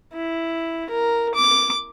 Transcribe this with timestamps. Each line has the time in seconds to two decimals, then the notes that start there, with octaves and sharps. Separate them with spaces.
0.14 E4
0.90 A#4
1.34 D6